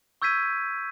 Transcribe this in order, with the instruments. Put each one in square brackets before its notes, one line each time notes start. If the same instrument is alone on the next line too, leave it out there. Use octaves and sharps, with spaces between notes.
[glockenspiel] C#6 E6 G6 G#6 B6 D#7